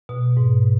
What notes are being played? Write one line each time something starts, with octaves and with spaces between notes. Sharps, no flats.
B2
G#2